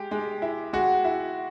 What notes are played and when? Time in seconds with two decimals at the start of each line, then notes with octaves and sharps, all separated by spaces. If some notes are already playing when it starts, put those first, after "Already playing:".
Already playing: G#3 G4
0.11 G#3
0.42 E4
0.73 G#3 F#4
1.05 E4